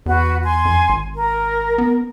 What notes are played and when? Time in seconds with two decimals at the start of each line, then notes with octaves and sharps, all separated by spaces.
0.06 E2 F#4 B4
0.44 G#5 C6
0.65 F2
0.89 G#1
1.15 A#4
1.78 B3